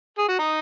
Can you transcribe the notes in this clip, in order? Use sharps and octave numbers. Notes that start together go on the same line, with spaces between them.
G#4
F#4
D#4